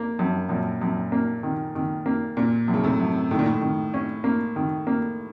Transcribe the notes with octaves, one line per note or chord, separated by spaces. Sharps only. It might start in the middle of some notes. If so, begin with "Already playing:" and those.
Already playing: A#3
F#2
F#2 A#2
F#2
A#3
D#3
D#3
A#3
A#2 A#3
F#2
C#3
A2 C3
F#2
A2 D#3
A#2
A2
D#3
C#4
A#3
D#3
A#3